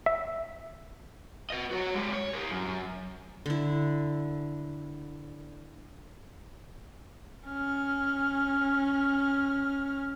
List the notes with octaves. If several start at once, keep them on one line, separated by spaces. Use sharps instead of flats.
E5
B4 D#5
F#4 C#5
G#3 G4
C#5
G4 A#4
F#2
D3 E4
C#4 F6